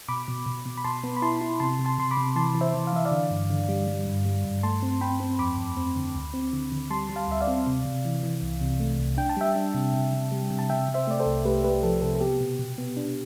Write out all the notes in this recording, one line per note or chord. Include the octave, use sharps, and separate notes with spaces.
B2 B5 D6
B2
B2
B2
B5
B2 A5 C6
B3
B5
E4 A5 C6
E4
C3 A5 C6
C3
A5 C6
C3 C6
B5 D6
C3
E3 A5 C6
E3
C5 E5
E3
F5
E3 E5
D5 F5
D3
G2
D3
G3
G3
G2
G3
G2
A3 A5 C6
C4
C4 G5 B5
C4
F2 B5 D6
F2
C4
D3
D2
C4
D3
D3
G3 A5 C6
G3
F5 A5
D2 E5
D5 F5
C4
C3
C3
E3
E3
C2
C3
A3
C2
D4 G5
A5
G3 E5 G5
D4
C3
C3
C3
G3
C3
A5
C3 E5 G5
C3
C5 E5
A3 D5
A4 C5
C2
A3 G4 B4
A3 G4 B4
F3 A4
C3 A4
A4
B3 G4
B2
B2
B3
D4